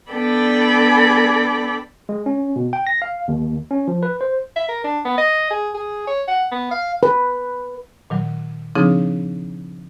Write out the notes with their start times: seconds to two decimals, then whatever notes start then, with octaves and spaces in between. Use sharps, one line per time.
0.11 B3 D4 A4 D5 G5 B5
2.09 G#3
2.26 C#4
2.56 B2
2.73 G5
2.87 A#6
3.02 F5
3.28 D#2
3.71 C#4
3.88 F3
4.03 B4
4.21 C5
4.56 E5
4.69 A#4
4.84 D4
5.05 B3
5.18 D#5
5.51 G#4
5.74 G#4
6.07 C#5
6.28 F#5
6.52 B3
6.71 F5
7.03 B4
8.10 A#2 D#3 F#3
8.75 C#3 F3 C4 D4 D#4 G#4